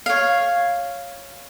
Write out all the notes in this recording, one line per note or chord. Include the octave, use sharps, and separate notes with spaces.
C#5 F5